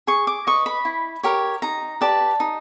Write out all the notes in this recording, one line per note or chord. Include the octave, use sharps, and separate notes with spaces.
G#4 C#6
D6
B4 D#5 C#6
B5
E4
G4 A#4 C#5
D#4 A#5
G4 B4 D5 A5
D#4